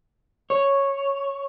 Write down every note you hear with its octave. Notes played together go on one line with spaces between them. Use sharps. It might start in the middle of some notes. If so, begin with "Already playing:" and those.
C#5